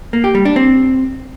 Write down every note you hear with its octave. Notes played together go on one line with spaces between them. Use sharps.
A#3
G4
G3
D4
C4